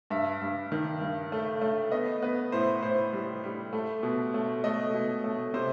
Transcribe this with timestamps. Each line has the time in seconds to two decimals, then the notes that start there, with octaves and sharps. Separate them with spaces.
0.10 G2 E5
0.41 G2
0.72 D#3
1.01 G2
1.32 A3
1.61 A3
1.92 B3 D#5
2.22 B3 B4
2.52 A2 C5
2.83 A2 C5
3.13 G3
3.44 G3
3.73 A3
4.03 B2
4.34 A3
4.64 A3 D#5
4.94 B2
5.24 A3
5.54 C3 C5